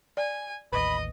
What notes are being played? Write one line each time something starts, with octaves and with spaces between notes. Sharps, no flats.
D5 G#5
A1 D#2 B4 D#5 B5